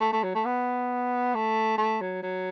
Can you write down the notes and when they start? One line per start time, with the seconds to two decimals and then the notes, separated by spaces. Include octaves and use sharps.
0.01 A3
0.13 A3
0.23 F#3
0.35 A3
0.45 B3
1.34 A3
1.78 A3
2.01 F#3
2.23 F#3